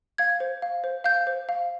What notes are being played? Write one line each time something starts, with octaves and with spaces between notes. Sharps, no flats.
F5 G#6
C5
F5
C5
F5 G6
C5
F5